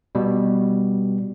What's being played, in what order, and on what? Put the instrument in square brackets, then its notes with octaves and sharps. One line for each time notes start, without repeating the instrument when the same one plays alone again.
[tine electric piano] B2 G3